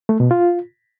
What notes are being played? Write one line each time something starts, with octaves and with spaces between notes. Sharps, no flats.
A3
B2
F4